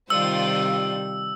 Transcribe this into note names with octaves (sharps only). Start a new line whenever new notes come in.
C3 D#3 G3 F4 C5 D5 E6